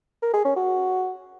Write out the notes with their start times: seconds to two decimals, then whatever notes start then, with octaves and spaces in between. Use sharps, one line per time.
0.22 A#4
0.34 G#4
0.45 C#4
0.56 F#4